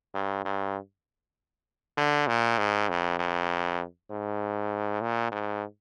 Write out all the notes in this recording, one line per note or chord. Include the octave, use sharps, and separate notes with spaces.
G2
G2
D3
A#2
G#2
F2
F2
G#2
A#2
G#2